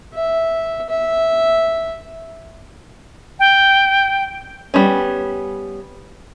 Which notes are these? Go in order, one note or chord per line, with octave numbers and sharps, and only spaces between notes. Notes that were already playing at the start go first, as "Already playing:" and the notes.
E5
E5
G5
G3 B3 C#4